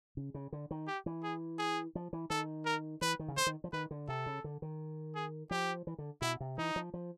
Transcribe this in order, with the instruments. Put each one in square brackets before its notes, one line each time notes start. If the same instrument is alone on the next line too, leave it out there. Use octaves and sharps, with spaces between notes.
[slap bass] C#3
C#3
D3
D#3
[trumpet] G4
[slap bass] E3
[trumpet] G#4
G#4
[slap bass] F3
E3
[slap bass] D#3 [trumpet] A4
[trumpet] A#4
[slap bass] E3 [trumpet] B4
[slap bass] D#3
C#3
[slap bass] D3 [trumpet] C5
[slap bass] D#3
F3
[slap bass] D#3 [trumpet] B4
[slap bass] D3
[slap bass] C3 [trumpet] A4
[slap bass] C#3
D3
D#3
[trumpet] G#4
[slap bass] F3 [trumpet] G4
[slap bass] E3
D3
[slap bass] B2 [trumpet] E4
[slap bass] C3
[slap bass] E3 [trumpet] D#4
[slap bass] F3
F3